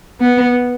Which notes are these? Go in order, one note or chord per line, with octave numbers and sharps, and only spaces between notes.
B3